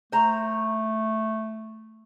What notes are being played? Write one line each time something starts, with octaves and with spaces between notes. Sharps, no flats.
A3 C5 A#5